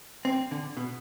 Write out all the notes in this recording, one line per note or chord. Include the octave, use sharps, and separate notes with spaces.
C4
D3
B2